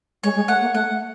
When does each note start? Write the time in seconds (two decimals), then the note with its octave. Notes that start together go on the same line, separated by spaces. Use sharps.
0.23 G#3 C#5
0.35 G#3
0.48 A3 F#5
0.61 A#3
0.74 A3 F#5
0.91 A3